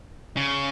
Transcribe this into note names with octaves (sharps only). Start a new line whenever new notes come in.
C#3